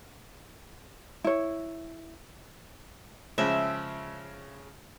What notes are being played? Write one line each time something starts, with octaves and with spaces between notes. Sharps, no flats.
E4 C#5
C#3 F3 G#3 E5